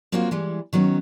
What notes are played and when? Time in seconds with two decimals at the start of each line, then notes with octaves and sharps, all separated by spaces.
0.12 F3 F#3 A#3 C4 F4 F#4
0.31 E3 G3 G#3
0.73 D#3 F#3 B3 C#4